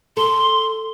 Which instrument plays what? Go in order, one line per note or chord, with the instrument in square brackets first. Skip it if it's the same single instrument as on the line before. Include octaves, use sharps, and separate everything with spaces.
[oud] A4 [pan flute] C6